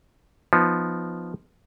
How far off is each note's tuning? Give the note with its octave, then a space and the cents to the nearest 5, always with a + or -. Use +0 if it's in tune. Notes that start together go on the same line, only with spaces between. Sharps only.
F3 +0 B3 +0 D#4 +0